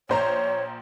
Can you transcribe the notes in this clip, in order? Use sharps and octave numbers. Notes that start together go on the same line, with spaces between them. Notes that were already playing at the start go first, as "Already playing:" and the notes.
A#1 C5 C#5 A#5